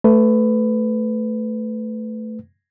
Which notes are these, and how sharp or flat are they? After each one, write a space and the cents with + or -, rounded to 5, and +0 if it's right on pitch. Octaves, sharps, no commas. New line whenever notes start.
A3 +0 B4 +20